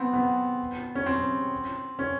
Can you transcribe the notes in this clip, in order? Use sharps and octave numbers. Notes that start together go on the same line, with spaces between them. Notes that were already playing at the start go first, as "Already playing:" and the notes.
Already playing: B3 C4
B3
C#4
C4
C#4